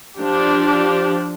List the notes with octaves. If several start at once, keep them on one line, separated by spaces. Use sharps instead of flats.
F3 D4 G4